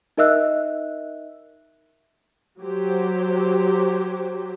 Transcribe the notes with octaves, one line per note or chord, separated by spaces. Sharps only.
D#4 A#4 D#5 E5 E6 F#6
F#3 G4 C5